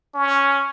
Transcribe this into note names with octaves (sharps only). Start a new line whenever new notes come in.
C#4